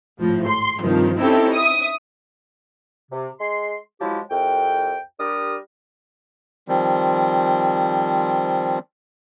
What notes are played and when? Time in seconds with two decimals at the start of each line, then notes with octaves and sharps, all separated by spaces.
0.19 G#1 A2 F3
0.48 C6
0.81 G2 C3 D#3 F3
1.19 C4 C#4 D#4 E4 G4 A4
1.54 E5 D#6
3.12 C3
3.40 G#3 C6
4.00 F3 F#3 G#3 E4 G4
4.31 C2 F2 G5
5.20 G3 D4 G4 A#4 D#6
6.68 D#3 F3 G3 C4